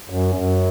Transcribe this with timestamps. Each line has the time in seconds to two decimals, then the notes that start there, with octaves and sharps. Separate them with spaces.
0.10 F#2
0.35 F#2